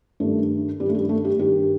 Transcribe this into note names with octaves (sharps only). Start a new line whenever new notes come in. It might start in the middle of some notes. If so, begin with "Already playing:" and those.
G2 D#3 A3
G2 D#3 G3
A3
G3
A3
G4
G2 D#3 G4